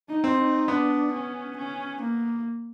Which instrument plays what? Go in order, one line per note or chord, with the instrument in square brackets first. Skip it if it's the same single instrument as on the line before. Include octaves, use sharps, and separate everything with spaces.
[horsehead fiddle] D#4
[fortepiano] C4
[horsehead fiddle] D#4
[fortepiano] B3 [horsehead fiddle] D4
[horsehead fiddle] C#4
C#4
A#3